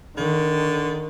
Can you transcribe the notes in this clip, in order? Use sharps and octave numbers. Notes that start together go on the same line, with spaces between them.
D3 D#3